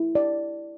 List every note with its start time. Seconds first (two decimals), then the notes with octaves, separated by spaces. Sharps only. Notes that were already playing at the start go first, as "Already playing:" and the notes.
Already playing: E4
0.15 D5